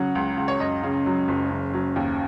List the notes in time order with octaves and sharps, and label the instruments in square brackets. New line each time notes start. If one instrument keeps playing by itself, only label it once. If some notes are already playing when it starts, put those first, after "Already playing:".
Already playing: [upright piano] C#3 F#3 F#5
C#2
C#2
C#5
F#2 D#5
C#3
F#3
F#1
C#3
F#3
D#2